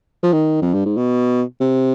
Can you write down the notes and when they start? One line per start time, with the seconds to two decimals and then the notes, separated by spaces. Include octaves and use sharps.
0.23 F3
0.33 D#3
0.62 F2
0.74 G2
0.85 G#2
0.97 B2
1.61 C3